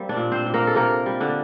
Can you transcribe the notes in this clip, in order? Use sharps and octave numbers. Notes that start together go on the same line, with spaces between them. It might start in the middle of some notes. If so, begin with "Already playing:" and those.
Already playing: G3 A#3 C4
D4 D5
A#2
C4 C5
A#2
A#3 A#4
A4
C3 A#3 A#4
G3
D3 D4